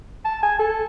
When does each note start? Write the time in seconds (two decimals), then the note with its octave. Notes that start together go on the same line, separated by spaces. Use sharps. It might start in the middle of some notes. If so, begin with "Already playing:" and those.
0.25 A5
0.43 G#5
0.59 A4